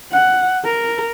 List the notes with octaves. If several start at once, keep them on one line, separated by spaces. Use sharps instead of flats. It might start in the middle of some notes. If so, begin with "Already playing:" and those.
F#5
A#4